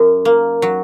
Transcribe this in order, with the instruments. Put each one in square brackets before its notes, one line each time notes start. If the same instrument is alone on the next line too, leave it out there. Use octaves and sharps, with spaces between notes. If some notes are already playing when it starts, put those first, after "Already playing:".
Already playing: [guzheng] F#2
A#3
F#3